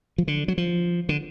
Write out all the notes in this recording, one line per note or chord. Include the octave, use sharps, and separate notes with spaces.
F3
D3
F#3
F3
D3